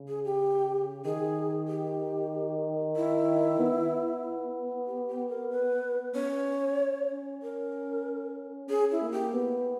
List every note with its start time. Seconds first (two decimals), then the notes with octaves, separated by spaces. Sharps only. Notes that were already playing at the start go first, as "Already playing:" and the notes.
Already playing: C#3
0.08 G#4
0.25 G4
1.05 D#3 G#4
1.68 G4
2.96 E4
3.59 B3
4.87 G4
5.08 G4
5.29 A#4
5.51 B4
6.15 C#4 C#5
7.11 C#4
7.43 A#4
8.69 C#4 G#4
8.92 E4
9.02 A#3
9.12 G4
9.34 B3